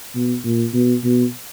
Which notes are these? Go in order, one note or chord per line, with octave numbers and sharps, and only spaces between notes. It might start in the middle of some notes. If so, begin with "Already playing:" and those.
B2
A#2
B2
B2